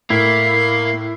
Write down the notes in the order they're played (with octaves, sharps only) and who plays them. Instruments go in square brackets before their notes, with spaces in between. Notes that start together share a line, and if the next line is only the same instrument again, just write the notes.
[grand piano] A2 [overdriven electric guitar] A#3 [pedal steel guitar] E4 [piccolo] C7